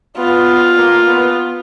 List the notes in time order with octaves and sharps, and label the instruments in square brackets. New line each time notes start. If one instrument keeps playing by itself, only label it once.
[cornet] B3 [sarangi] F4
[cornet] A#3
B3